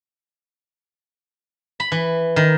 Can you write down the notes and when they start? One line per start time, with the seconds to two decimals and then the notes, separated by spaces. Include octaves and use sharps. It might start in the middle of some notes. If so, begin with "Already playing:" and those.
1.80 B5
1.92 E3
2.36 D#3